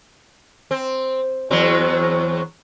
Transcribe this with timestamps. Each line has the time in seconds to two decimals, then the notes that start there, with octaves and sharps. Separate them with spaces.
0.71 C4
1.51 E2 F#3 C4